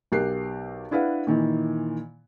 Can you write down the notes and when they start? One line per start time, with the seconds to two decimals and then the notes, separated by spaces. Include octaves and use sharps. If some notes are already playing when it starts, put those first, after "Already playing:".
0.12 B1 G4 A#4 F#6 C7
0.91 D4 E4 B4 F5 F#5
1.27 A#2 D#3 E3